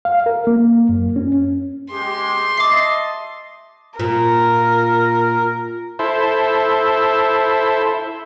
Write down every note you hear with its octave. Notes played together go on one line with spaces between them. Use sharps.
F5
A#4
A#3
F#2
C#4
G#3 G4 C6
D#5 E5 A5 D6 C7
A#2 A#4
E4 A4 C5